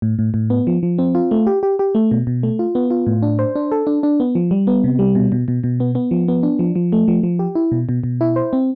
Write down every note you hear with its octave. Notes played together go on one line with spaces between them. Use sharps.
A2
A2
A2
B3
F3
F3
C4
F4
A3
G4
G4
G4
A3
B2
B2
A3
F4
B3
F4
A2
D4
C5
D4
A4
D4
D4
B3
F3
G3
B3
C3
G3
B2
B2
B2
B2
B3
B3
F3
B3
D4
F3
F3
A3
F3
F3
G4
E4
B2
B2
B2
E4
C5
C4